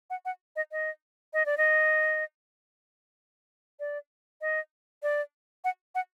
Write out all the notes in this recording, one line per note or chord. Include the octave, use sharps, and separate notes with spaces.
F#5
F#5
D#5
D#5
D#5
D5
D#5
D5
D#5
D5
F#5
F#5